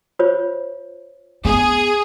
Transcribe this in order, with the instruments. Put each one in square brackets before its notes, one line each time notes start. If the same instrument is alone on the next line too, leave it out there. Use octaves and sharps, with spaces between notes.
[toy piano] F4 C5 C#5
[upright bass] B3 [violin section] G#4